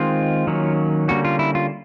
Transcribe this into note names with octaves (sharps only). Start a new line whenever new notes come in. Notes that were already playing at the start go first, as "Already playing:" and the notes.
Already playing: D#3 G#3 C4 F4
D#3 F#3 A#3 C#4
D3 G3 A#3 C#4 F#4
F4
E4
F4